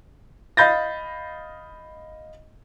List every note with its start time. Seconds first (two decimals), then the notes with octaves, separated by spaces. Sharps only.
0.57 D#5 F5 B5 G6 A6 A#6